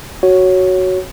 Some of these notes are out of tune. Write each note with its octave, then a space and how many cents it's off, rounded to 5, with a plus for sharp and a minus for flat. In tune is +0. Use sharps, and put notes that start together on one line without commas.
F#4 +5 C#5 +0